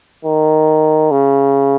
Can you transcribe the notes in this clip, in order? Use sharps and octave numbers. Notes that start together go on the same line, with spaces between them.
D#3
C#3